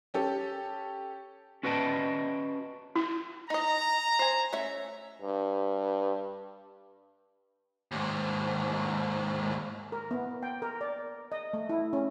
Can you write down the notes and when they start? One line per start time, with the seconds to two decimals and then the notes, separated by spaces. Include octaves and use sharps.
0.14 C#4 G4 A4
1.63 C#4 F#4 B4 D#5 G5 A5
2.96 E4
3.50 D#4 D#5 A#5
4.19 C5 G#5
4.53 A3 C#4 E5
5.22 G2
7.92 D#2 G#2
9.92 A#4
10.11 B3
10.43 G5
10.62 A#4
10.81 D5
11.32 D#5
11.53 A3
11.69 E4
11.93 C#4